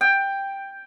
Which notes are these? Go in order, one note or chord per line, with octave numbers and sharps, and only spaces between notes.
G5